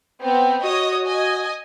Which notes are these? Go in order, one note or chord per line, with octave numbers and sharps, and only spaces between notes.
B3 C4
F#4 C#5 D#5 D#6
D#5 G#5